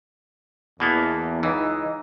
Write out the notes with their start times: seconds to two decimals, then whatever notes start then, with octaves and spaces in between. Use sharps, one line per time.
0.80 E2 B2 A#3 B3
1.43 C#2 E3 D#4